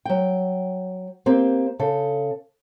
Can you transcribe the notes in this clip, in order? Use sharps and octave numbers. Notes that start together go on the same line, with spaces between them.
F#3 G5
A#3 C4 G4
C#3 A4